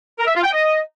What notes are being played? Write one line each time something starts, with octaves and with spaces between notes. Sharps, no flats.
A#4
E5
F4
G5
D#5